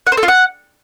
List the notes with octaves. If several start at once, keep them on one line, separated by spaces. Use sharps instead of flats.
F#5
C5
A4
F4
F#5